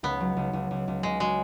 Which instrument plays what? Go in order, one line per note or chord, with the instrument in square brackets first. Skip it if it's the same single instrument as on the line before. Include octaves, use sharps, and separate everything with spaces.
[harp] C#2 [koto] B3
[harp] F#3
C#2
C#2
C#2
C#2
[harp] C#2 [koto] G#3
[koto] G#3 [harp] F#4